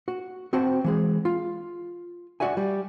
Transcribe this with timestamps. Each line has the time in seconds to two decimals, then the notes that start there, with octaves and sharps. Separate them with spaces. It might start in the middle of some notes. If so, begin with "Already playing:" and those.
0.08 F#4
0.53 C4 F#4 C5 F#5 G5 A5
0.84 E3 G#3 G#4
1.25 F4
2.40 F#4 D5 E5 G#5
2.57 G3